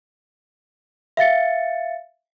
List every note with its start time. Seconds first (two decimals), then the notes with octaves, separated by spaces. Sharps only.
1.17 E5 F5 A6 C#7